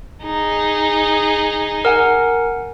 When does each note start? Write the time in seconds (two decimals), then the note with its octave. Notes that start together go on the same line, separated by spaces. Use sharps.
0.23 D#4 G#4
1.85 A#4 F#5 G#5